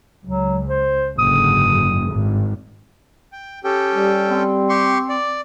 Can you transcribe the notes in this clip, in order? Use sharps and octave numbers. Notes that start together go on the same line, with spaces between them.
C#2 F#3
C5
F#1 G#2 D3 D#6
G#1 G2
G5
C#4 G4 A4 G5
G3
C4
G4 C6 C#6
D5